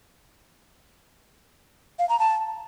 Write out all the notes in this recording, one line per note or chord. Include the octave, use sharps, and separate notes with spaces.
F5
A#5
A5